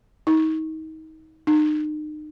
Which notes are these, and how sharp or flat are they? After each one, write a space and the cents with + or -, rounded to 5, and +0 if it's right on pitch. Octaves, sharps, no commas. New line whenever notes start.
D#4 +30
D#4 -35